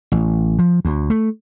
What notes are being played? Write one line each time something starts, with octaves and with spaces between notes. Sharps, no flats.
A1
F3
D2
A3